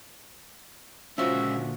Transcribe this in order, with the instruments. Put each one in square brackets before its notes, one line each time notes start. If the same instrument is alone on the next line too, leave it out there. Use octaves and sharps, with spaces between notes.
[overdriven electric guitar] C#2 C#4 [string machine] A#2 D3 [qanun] F3 F#4 [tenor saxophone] E5